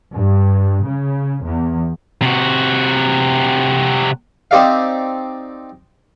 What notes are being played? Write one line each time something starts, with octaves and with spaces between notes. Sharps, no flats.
G2
C#3
E2
C3 F#4
C4 D#4 G4 D5 E5 F5